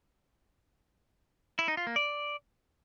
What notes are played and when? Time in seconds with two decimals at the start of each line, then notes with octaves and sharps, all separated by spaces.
1.59 E4
1.68 D#4
1.77 F4
1.87 A#3
1.96 D5